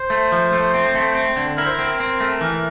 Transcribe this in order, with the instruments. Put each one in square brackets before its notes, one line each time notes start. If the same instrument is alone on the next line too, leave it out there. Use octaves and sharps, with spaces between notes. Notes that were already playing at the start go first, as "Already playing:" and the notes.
Already playing: [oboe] C5
[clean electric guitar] A3
F3
A3
C4
A3
C4
D3
[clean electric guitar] E4 [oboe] A#4
[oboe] C5
A#4
[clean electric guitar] C4
C4
A3
E3